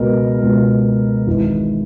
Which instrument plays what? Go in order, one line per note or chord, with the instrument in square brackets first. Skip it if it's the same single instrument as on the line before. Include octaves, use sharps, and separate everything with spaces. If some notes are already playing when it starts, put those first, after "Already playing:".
Already playing: [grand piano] C#2 B2 A#4
C#2 B2
G#1 G#2 E3